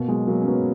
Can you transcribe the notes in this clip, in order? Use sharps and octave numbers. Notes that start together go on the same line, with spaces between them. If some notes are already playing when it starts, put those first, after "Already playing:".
Already playing: B2 A#3
F#3 G#3
F#3 A#3
C#4
F#3 B3